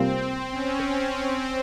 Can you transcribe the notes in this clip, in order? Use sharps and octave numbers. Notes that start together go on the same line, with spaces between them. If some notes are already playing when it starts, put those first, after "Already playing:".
Already playing: C3 G3 A#3 C4 F4
C#4
C4